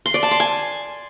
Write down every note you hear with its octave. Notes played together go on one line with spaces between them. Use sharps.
C6
D5
A5
C6
G#5